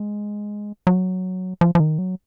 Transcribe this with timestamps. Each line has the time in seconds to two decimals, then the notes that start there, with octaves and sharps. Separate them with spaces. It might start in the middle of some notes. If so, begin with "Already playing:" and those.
Already playing: G#3
0.87 F#3
1.61 F3
1.75 F3
1.80 D#3
1.98 F#3